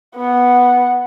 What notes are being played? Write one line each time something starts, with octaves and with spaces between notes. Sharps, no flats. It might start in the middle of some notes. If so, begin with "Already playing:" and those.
B3 F#5